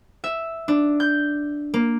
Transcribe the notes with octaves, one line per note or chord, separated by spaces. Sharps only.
E5
D4
G6
A#3